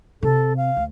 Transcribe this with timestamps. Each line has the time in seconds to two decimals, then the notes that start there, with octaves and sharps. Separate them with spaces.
0.23 C3 A4
0.57 F5
0.77 D2